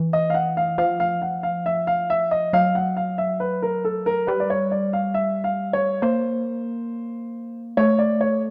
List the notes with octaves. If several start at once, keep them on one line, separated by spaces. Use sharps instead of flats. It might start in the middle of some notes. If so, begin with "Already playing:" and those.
Already playing: E3
D#5
F5
F#5
F5
F3 F5
F5
F#5
F5
E5
F5
E5
D#5
F#3 F5
F#5
F5
E5
B4
A#4
A4
A#4
G3 B4
D5
C#5
D5
F5
E5
F5
C#5
A#3 C5
A3 C#5
D5
C#5